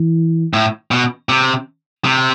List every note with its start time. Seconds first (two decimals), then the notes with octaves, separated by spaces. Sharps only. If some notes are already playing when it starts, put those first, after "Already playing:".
Already playing: E3
0.53 A2
0.91 B2
1.29 C3
2.05 C3